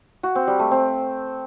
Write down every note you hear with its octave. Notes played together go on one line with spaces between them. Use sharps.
F#4
C4
G3
A3
C4